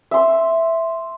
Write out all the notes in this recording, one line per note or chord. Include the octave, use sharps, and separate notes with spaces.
E5 C6